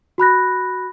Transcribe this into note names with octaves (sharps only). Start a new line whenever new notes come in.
F#4 B5 F#6 A#6